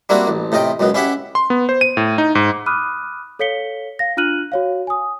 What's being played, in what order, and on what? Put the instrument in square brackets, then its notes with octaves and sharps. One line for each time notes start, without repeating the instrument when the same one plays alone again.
[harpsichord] G3 A#3 C4 D4 E4 F#4
A1
A2 C3 F4 D#5 G5
C#2 F#2 B2 B3
C#4 E4 G4 E5 F#5
[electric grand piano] C6
B3
C5
D#7
A2
D#4
G#2
[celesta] B5 D6 D#6 F6 F#6 D#7
A4 C#5 F5 B6 C#7 G7
F5 A#6
D4 F4 F6 F#6 D#7 F#7
F#4 C#5 F5
G#5 D#6